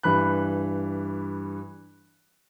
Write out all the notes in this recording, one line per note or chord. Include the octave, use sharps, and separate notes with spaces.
G2 E3 B5 F#6